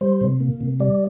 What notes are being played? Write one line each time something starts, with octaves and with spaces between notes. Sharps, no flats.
G3 C5
C3
A#3
C3
G3 D5